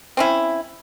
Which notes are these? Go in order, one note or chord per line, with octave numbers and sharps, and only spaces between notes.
C4 C#4 E4